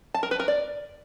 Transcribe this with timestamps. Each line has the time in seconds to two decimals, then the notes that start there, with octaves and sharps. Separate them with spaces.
0.14 A5
0.23 A#4
0.31 B4
0.40 A#4
0.48 D5